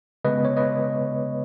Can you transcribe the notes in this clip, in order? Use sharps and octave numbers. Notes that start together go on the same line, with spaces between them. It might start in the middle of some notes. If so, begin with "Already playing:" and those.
C#3 G#3 B3 B4 D#5
C#5
B4 D#5